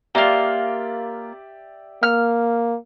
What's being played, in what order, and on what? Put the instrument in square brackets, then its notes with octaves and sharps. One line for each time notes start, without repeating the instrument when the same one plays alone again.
[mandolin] A#3 F4 [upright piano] G4 D5 E5
[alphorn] A#3 [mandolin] F6